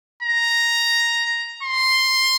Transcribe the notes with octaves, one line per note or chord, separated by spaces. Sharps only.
A#5
C6